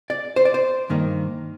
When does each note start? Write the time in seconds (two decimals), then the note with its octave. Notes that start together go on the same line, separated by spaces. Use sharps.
0.10 D5
0.36 C5
0.45 D5
0.54 C5
0.90 G2 D#3 A#3